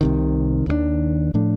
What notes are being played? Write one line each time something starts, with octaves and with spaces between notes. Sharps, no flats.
C2 C3 D#3
D#2 D#3 A#3 D4
A2 F3 A3 D4